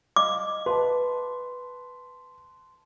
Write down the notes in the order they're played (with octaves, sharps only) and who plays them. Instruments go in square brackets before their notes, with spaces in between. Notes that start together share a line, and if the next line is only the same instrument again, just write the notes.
[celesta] D#5 F5 [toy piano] D6
[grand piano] B4 [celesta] A5 C6